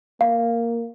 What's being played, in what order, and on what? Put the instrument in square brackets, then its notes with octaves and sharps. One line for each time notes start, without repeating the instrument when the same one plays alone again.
[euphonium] A#3 [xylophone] F5